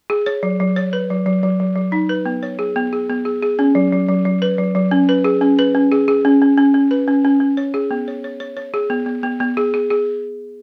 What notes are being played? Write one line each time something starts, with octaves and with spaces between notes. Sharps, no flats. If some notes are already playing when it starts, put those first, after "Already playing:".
G#4
C#5
F#3
F#3
C#5
B4
F#3
F#3
F#3
F#3
F#3
D#4
B4
B3
C#5
G#4
B3
G#4
B3
G#4
G#4
C#4
F#3
F#3
F#3
F#3
B4
F#3
F#3
C#4
B4
G#4
C#4
B4
C#4
G#4
G#4
C#4
C#4
C#4
C#4
B4
C#4
C#4
C#4
C#5
G#4
B3
C#5
C#5
C#5
C#5
G#4
B3
B3
B3
B3
G#4
G#4
G#4